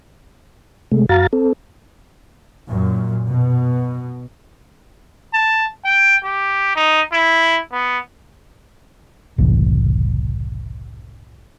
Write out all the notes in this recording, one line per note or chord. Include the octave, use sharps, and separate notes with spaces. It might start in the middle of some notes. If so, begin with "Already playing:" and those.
C3 G#3 A3
F#2 F#4 F5 A#5 A6
C4 A4
F#2 A#2
B2
A5
G5
G4
D#4
E4
B3
F#1 C2 A2 E3